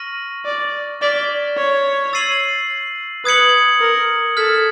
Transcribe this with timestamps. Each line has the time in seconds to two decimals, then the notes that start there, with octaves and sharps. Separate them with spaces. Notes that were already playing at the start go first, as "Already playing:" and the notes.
Already playing: C#6 F6 A#6 D#7 F#7
0.45 D5
1.01 D5 F6 G#6 B6 E7 G7
1.57 C#5
2.13 E6 A6 C7 D#7 F#7
3.25 B4 D#6 G#6 C#7 F#7
3.81 A#4
4.37 A4 F6 G#6 B6